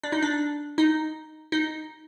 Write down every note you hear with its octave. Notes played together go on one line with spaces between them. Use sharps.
D4
D#4
D4
D#4
D#4